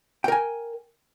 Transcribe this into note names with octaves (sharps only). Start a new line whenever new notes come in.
A#4 G5 G#5